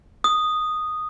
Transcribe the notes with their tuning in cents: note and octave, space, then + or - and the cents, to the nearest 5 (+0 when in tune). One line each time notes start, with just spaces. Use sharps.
D#6 -5